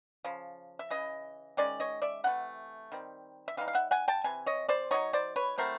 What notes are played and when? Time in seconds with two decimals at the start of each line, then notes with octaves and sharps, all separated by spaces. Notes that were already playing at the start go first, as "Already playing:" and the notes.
0.25 C#3 F3
0.79 E5
0.90 C#3 E3 D#5
1.57 D#3 G#3 C#4 D5
1.80 C#5 D#5
2.02 D5 E5
2.24 C3 E3 A3 F#5
2.92 D#3 G3 C4
3.48 E5
3.57 E3 G3 D#4 F5
3.68 F5
3.74 E5 F#5
3.91 F#5 G#5
4.08 G5 A5
4.24 C3 E3 G#5
4.46 C#5 D#5
4.69 C5 D5
4.91 F#3 A#3 D#4 C#5 D#5
5.13 C5 D5
5.36 B4 C#5
5.58 F#3 A3 C4 E4 A#4 C5